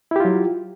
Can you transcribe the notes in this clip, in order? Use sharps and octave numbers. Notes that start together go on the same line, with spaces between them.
F#3 E4 F4 G4